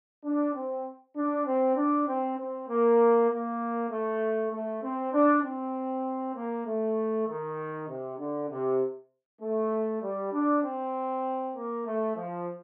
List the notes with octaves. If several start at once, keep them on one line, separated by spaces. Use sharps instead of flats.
D4
C4
D4
C4
D4
C4
C4
A#3
A#3
A3
A3
C4
D4
C4
A#3
A3
D#3
C3
D3
C3
A3
G3
D4
C4
A#3
A3
F3